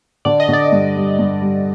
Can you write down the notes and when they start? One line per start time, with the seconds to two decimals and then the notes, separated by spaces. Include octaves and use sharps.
0.25 D3 D5
0.40 D#5
0.49 D3 D5
0.72 G2
0.96 G3
1.19 G2
1.41 G3